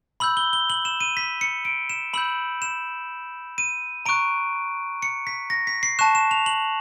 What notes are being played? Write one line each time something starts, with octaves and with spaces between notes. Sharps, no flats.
B5 E6 G6 F#7
G7
G7
F#7
E7
D#7
B6
C#7
D7
E7
B5 E6 G6 F#7
E7
D#7
A#5 C#6 F#6 D7
C#7
B6
A#6
B6
C7
A5 C#6 F#6 E7
E7
F7
F#7